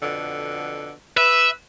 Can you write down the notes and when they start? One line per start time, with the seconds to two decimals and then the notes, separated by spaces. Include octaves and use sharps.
0.02 F2 B2 D3
1.17 B4 E5